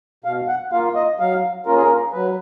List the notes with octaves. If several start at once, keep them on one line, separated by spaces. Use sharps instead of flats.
B2 F5
F#5
A#3 F4 F5
D#5
F#3 F5
A#3 C#4 F4 A#4
G#4
A#4
F#3 B4